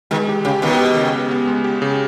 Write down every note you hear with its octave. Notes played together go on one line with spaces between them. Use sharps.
B2 D#3 G#3
G4
C#3 G4
B2 D#3 B3
G4
C#3
B3
B3
G#3
G4
C#3